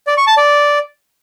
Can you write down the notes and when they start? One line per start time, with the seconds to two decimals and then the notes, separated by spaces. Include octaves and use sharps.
0.07 D5
0.17 C#6
0.27 A5
0.37 D5